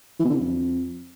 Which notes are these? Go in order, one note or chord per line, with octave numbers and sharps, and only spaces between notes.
E3
B2
D3
C3
F2